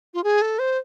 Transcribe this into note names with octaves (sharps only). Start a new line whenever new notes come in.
F4
G#4
A4
C5